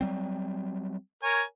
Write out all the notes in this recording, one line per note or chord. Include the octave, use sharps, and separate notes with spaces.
F#3 G3 C4
A#4 C#5 G#5